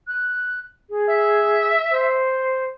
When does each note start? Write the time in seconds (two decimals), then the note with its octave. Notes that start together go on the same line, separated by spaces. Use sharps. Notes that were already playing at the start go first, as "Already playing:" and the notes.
0.07 F#6
0.90 G#4
1.09 E5
1.91 C5